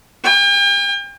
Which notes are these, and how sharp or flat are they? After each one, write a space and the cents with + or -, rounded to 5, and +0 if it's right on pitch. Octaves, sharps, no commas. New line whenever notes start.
G5 +40